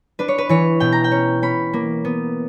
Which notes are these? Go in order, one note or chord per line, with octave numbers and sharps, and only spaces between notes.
D4 B4
C#5
B4
E3 C#5
B2 G5
A#5
G5
C#4
C#4 B5
A#3
B3